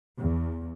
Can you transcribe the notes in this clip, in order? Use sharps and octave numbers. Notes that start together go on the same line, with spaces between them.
E2